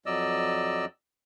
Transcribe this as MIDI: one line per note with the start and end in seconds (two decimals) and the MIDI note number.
0.06 0.85 41
0.06 0.85 54
0.06 0.85 74
0.06 0.85 75
0.06 0.85 88